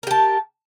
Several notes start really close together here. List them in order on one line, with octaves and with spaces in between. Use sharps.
A#4 G4 A5